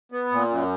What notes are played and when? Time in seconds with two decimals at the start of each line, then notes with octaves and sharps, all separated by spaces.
0.12 B3
0.32 A#2
0.50 F#2